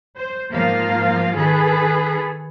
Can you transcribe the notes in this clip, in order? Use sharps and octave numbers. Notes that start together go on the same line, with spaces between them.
C5
G#2 F3 A#3 F4 F5
D#3 G#4 A4 B4